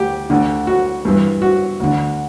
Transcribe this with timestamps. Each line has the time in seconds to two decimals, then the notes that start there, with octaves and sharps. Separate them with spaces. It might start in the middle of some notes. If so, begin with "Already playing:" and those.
Already playing: D2 G4
0.30 D2 D3
0.67 F#4
1.05 G2 E3
1.42 F#4
1.80 D2 D3